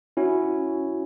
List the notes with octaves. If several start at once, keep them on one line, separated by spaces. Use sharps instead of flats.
C#4 E4 F#4